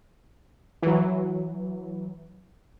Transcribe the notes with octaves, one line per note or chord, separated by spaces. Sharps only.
E3 F#3